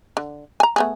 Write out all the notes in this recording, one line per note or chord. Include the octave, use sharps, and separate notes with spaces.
D3
G#5 A#5
A3 B3 G#4